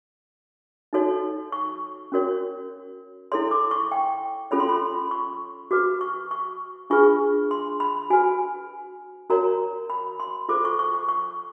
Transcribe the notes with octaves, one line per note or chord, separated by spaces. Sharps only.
D#4 F#4 A4 C#5
C#6
C#4 F#4 A#4 C#5
E4 A4 C#5 C6
D6
C#6
G5
C#4 F4 A4 C#5 B5
C6
B5
C#6
F#4 B4 D6
C#6
C#6
D4 F4 G#4 B4 C#6
C6
B5
F#4 B4 G#5
F#4 A#4 C#5 A#5
B5
C6
F4 A4 C5 D6
C#6
C#6
C#6
C#6